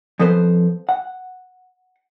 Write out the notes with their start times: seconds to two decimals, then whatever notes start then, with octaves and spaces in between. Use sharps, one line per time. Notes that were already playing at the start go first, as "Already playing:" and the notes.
0.19 F2 F3 B3 A4 B4 C5
0.89 F#5